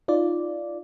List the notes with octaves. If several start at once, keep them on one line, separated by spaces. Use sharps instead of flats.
D#4 F4 D5